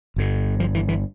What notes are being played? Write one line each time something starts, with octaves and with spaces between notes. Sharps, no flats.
G1 G2 D3
F3
E3
E3